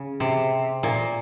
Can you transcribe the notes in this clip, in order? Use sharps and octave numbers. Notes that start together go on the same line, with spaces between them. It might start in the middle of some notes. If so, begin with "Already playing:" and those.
Already playing: C#3
C3
A#2